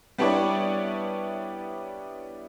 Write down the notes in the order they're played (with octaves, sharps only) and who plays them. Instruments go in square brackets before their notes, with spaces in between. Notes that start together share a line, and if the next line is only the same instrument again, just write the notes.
[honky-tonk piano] G3 B3 D4 E4 C#5 D5